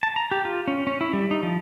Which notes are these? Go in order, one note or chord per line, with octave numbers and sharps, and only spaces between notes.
A5
A#5
G4
F4
C#4
C#4
E4
G3
D#4
F3